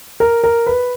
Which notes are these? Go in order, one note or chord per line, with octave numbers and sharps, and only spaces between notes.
A#4
A#4
B4